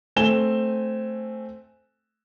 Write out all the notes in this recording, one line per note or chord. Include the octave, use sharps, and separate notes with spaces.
A3 C4 G#5 E7 G7